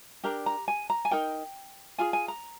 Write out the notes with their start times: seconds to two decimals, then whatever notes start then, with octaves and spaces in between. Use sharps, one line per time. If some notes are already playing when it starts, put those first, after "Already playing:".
0.24 D4 G4 A#4 A#5
0.46 A#5
0.68 G#5
0.90 A#5
1.05 G#5
1.11 D#4 A#4 G5
1.98 F4 G#4 G#5
2.13 G#5
2.28 A#5